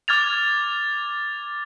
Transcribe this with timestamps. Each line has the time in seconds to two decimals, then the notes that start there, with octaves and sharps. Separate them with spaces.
0.08 D6 F6 G#6 A6 F7